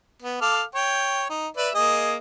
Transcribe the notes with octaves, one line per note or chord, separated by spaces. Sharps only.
B3
A4 F5 D6
C#5 G5
D#4
B4 D5 E5
A#3 G#4 D#5